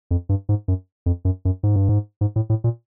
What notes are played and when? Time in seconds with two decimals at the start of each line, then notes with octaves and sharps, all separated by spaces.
0.11 F2
0.29 G2
0.49 G#2
0.68 F#2
1.06 F2
1.25 F#2
1.45 F#2
1.63 G#2
1.76 G2
1.89 G#2
2.21 G#2
2.36 A2
2.50 A2
2.64 A#2